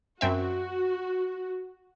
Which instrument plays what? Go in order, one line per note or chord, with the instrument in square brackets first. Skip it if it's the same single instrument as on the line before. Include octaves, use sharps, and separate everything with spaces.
[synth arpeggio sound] F#2 C4 E5 [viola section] F#4